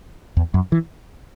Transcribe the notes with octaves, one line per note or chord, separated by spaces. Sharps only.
E2
F#2
E3